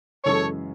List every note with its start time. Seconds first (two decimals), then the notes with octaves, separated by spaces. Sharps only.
0.25 F#2 C#3 E3 G#3 C#4 A4 C#5